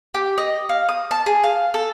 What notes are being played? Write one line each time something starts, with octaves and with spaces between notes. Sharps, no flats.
G4
D#5
F5
D#6
A5
G#4
F5
A4